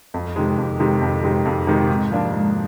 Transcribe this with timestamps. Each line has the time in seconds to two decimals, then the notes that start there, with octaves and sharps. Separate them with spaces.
0.14 F2
0.36 C3 D#3 G#3
0.58 F2
0.80 C3 D#3 G#3
1.01 F2
1.24 C3 D#3 G#3
1.45 F2
1.67 C3 D#3 G#3
1.89 G#2
2.11 F3 A#3 D4
2.33 G#2